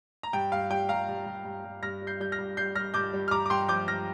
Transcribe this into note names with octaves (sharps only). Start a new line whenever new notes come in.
A#5
G2 G5
G2 F5
G3 G5
G2 F5 A#5
G2
G2
G2
G2
G2 F6 A#6
G3
G6 C7
G3 G6
F6 A#6
G2
G3 G6 C7
G3 F6 A#6
G2 D6 G6
G3
F6
G2 A#5 D6
D6
G2 G5 C6
F3 D6 G6
G2 F6 A#6